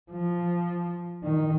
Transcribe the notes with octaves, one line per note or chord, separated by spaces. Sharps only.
F3
D#3